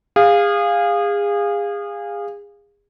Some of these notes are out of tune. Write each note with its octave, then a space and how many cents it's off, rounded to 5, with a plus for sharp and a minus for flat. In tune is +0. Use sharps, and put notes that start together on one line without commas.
G#4 -30 F5 +5